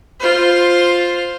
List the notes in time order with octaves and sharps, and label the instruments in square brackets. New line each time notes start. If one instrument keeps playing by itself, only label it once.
[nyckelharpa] F4 C5